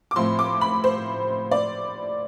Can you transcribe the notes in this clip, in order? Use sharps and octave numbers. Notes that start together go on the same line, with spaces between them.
D6
A2 F3 C4 C6
D6
B5
C5
D5